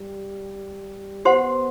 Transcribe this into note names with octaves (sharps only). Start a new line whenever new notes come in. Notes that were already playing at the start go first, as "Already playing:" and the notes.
Already playing: G3
B3 G4 C5 F#5 C6